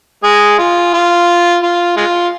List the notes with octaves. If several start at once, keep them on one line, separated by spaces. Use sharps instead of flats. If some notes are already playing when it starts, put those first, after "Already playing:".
G#3 G#4
F4
F4
F4
G#3 F4